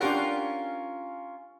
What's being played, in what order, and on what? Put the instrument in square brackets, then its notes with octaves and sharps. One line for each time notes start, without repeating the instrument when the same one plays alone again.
[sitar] C#4 F4 A#4 [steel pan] D4 G4 F#5